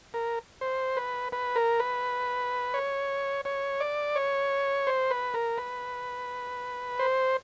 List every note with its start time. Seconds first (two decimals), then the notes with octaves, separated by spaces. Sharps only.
0.14 A#4
0.61 C5
0.97 B4
1.32 B4
1.56 A#4
1.80 B4
2.74 C#5
3.45 C#5
3.80 D5
4.16 C#5
4.87 C5
5.11 B4
5.34 A#4
5.58 B4
6.99 C5